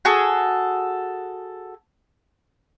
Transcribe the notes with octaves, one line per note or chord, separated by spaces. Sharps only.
F#4 G#4 A4